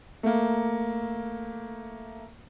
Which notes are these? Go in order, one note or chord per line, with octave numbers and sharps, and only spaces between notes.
A3 A#3